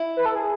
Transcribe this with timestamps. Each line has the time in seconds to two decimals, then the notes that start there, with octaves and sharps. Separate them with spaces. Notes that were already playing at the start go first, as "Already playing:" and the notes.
Already playing: E4
0.17 B4
0.26 A4
0.35 G#4